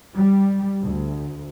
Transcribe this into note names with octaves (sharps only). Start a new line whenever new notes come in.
G3
D2